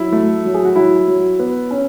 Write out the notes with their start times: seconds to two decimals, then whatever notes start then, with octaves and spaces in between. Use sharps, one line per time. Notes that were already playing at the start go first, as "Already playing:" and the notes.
Already playing: F#3 E4
0.12 A3
0.45 F#3
0.54 G#4
0.65 F#4
0.76 F#3 E4
1.08 F#3
1.39 B3
1.71 C#4